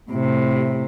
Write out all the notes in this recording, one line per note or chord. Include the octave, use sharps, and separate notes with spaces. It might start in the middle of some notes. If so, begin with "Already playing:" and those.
A2 C3